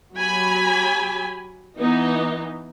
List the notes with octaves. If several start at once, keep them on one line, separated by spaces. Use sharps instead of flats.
F#3 G4 G#5 B5
E3 B3 D#4